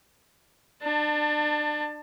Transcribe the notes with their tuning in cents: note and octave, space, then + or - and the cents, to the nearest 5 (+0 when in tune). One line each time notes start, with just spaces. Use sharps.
D4 +30 A5 +20